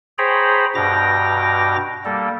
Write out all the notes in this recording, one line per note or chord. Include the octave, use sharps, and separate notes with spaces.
G#4 C5 C#5 G5 A#5 B5
G2 B2 G5 A#5 D6 A#6
G3 A#3 A4